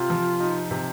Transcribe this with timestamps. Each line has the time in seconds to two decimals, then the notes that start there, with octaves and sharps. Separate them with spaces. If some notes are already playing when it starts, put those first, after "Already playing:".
Already playing: C3 F4
0.10 F3
0.40 D#4
0.71 C3